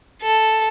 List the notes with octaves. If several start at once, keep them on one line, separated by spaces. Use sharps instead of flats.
A4